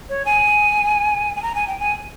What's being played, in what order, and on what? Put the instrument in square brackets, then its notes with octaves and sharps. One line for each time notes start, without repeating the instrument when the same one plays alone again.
[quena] C#5
G#5
G#5
A#5
G#5
G5
G#5